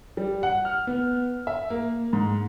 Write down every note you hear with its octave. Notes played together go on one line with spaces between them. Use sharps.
G3
F#5
F6
B3
E5
A#3
G#2